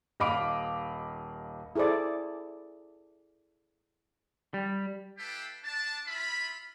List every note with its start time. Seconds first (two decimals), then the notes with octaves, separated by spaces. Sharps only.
0.20 D#1 D#5 F5 B5 D6 D7
1.76 E4 G#4 A4 C5 D5
4.54 G3
5.17 E4 G4 A4 B4 F5 G5
5.63 D4 A5
6.06 E4 F4 E5 B5